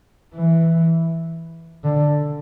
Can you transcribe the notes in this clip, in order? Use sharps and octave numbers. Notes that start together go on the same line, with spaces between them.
E3
D3